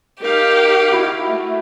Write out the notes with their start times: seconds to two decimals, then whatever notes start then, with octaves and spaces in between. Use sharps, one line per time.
0.22 D#4 G4 A#4 F5
0.92 E4 F#4
1.28 A3 E5